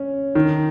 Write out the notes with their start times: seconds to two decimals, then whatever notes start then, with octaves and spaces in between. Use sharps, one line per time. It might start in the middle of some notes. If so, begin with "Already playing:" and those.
Already playing: C#4
0.35 D#3